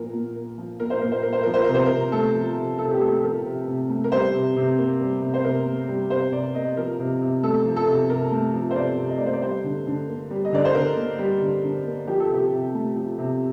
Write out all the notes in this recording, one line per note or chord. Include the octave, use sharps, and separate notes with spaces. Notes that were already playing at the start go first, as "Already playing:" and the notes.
Already playing: A#2 F3 A#3 A#4
A#2
A#3
F3
A#2 A#4
C5
A#2 A#4
C5
A#3 A#4
C5
F3 A#4
C5
C3 A#4
C5
C3 A#4
A3 A4
F3
C3
C3 A4
G4
A3 A4
A4
F3 A#4
C3
C3
A3
A#4
G3 C5
C3
C3
A#3
G3
C3
C5
C3 A#4
A#3
G3
C3 C5
C3 D5
A#3 D#5
F3 A#4
C3
C3
A3 A4
F3
A4
C3
C3 A#4
A3
F3
C5
C3 D5
C3
D#5
A3 D5
C5
D5
G3 C5
D3
D3
A#3
G3
D#5
D3 D5
C5
D3 A#4
A#3
G3
D3
D3
A#3
F3 G4
A4
C3 G4
C3
A3
F3
C3